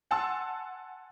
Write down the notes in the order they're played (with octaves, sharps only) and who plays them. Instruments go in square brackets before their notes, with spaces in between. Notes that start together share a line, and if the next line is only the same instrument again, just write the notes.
[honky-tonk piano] F#5 G#5 A5 C6 E6